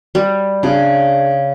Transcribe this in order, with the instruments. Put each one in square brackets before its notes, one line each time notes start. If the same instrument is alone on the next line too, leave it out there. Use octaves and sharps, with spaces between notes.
[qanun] G3
[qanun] C#3 [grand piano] D4 G#4